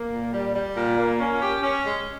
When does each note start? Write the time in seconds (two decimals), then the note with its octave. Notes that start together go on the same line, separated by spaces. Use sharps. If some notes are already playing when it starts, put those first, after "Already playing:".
Already playing: A#3
0.11 A#2
0.33 G3
0.54 G3
0.76 A#2
0.98 A#3
1.20 C#4
1.41 G4
1.62 C#4
1.85 G#3